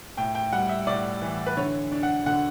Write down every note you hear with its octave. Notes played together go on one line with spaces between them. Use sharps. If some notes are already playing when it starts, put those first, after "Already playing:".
A2 G5
G5
G3 F#5
E5
A2 D5
E3
B4
D3 C#5
D4
F#5
D3 F#5